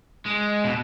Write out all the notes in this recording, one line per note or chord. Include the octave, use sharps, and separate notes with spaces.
G#3
B2